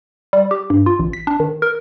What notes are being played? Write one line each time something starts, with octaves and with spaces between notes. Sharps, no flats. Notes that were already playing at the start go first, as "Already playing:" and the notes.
G3
G4
G2
F4
A1
B6
D4
D#3
A#4